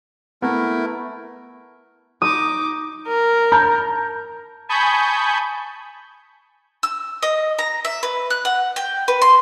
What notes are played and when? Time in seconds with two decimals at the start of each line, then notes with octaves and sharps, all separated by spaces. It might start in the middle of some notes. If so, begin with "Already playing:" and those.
0.42 A3 B3 E4 A#4
2.22 D#4 D6 D#6
3.08 A#4
3.52 A5 A#5 G6
4.69 G#5 A5 B5 C#6 D#6 G6
6.83 E6
7.22 D#5
7.59 A#5
7.85 E5
8.03 B4
8.30 F#6
8.45 F#5
8.76 G5
9.08 B4
9.22 C6